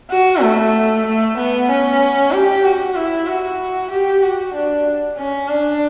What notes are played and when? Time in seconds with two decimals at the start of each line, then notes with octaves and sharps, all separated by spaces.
0.11 F#4
0.42 A3
1.06 A3
1.37 B3
1.69 C#4
2.32 G4
2.65 F#4
2.96 E4
3.27 F#4
3.91 G4
4.22 F#4
4.54 D4
5.18 C#4
5.49 D4